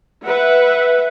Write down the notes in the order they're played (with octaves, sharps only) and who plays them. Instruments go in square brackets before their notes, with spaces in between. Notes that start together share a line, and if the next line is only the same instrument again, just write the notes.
[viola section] B4 E5 F#5